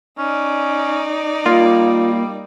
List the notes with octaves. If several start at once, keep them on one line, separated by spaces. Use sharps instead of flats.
C#4 D#4 D5
G3 A#3 F4